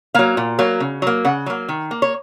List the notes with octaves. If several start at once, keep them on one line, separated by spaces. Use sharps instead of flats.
F#3 A#3 F5
A#2
F#3 A#3
C#3
F#3 A#3
C#3 F#5
F#3 A#3
D#3
A#3
C#5